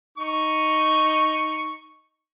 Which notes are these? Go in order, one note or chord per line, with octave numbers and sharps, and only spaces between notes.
D#4 C#6